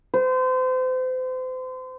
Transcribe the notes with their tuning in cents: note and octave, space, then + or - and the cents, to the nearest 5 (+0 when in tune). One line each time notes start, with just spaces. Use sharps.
C5 -35